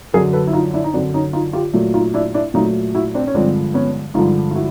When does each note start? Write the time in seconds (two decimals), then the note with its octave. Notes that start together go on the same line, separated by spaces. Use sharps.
0.14 F#2 D3 F#3 G#4 A#4
0.33 A4 B4
0.47 E4
0.53 D#4 F4
0.74 D4 E4
0.84 D#4
0.94 F#2 D3 F#3 C4 D4
1.14 C#4 D#4
1.33 D#4 F4
1.53 F4 G4
1.73 A#2 F#3 A3
1.94 D#4 F4
2.14 D4 E4
2.34 D4 E4
2.54 A#2 F#3 A3 D#4 F4
2.95 E4 F#4
3.14 C4 D4
3.27 C#4
3.34 G2 D3 F3 G#3 C4 D4
3.74 B3 C#4
4.14 G2 D3 F3 G#3 D#4 F4
4.51 F4
4.55 E4 F#4